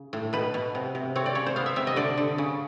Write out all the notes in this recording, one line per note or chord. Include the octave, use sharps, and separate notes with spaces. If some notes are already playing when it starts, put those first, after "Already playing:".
Already playing: C#3
A2
B2 B4
B2
C3
C3
C4 C#5
D5
C#3 C#5
C5
B3 F5
E5
C3 E5
D#5
D3 D5
D3
C#3